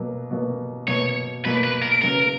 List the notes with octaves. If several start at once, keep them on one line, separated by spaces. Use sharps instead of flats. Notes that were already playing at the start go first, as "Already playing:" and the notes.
Already playing: B2 F#3 A#3
B2 F#3 A#3
B2 F#3 A#3 C#5
B2 F#3 A#3 B4
B4
A#4
C#3 F#3 B3 A#4